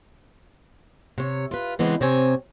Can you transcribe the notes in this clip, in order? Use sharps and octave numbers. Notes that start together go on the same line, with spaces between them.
C3 C#5
F4 B4
C#3 E3 G#3 B3 C4
C3 C4 C#5 G#5